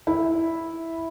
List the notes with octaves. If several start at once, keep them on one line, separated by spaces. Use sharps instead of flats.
E4